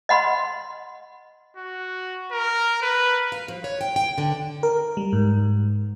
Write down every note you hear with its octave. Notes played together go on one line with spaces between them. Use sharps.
D#5 F#5 B5 C6
F#4
A#4
B4
F5
F3
C#5
G5
G5
D3
A#4
G3
G#2